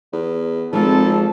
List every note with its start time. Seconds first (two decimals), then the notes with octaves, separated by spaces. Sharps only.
0.13 E2
0.73 G#1 F3 G#3 C4 A4